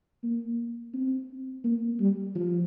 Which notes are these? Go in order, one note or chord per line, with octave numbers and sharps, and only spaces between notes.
A#3
C4
A#3
G3
F3